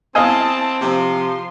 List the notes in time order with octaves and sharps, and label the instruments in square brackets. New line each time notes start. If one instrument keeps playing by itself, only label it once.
[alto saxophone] C4 [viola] E4 A5 [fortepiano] D#5 F5 G#5
[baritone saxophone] C3 [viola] F3 C6